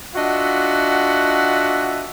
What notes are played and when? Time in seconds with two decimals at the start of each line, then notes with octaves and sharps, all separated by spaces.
0.15 D4 F4 F#4 D#5 E5 F#5